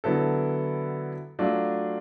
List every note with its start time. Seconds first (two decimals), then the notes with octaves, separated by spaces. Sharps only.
0.04 D3 F#3 B3 E4 A4
1.39 F#3 A3 D4 F4